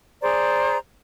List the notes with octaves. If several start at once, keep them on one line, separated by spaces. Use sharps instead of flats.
G#4 C5 D5 A#5